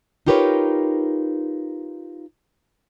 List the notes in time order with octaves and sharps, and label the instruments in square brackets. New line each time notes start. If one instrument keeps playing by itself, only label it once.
[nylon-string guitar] D#4 F4 G4 A#4 B4 C#5